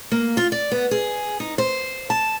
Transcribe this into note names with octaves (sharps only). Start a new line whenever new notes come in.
A#3
F4
D5
B3
G#4
D#4
C5
A5